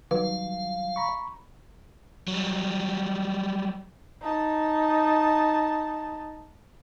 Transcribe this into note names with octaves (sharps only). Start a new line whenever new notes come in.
D#3 F#3 G3 B4 F5
A#5 B5 C#6
F#3 G3
D#4 A5